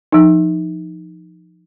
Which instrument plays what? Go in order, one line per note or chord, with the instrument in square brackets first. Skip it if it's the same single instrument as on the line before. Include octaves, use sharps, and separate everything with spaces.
[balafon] F3 D#4